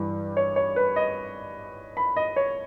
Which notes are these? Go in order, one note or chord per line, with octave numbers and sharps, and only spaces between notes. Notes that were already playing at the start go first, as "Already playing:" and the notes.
Already playing: G2 E3 G3
C#5
C#5
B4
D#5
B5
D#5
C#5